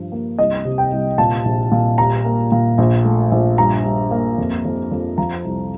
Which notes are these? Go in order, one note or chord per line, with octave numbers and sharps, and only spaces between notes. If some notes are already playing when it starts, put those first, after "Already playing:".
Already playing: G2 F3
A#3
C2 D#5
C3
G5
C2
A#2 A5
A#1
A#2
G3 A#5
A#3
A#2
A#1
A3
A#1
G2 A#5
G2
A#3
F2
F2
F2
F3 A#5
C2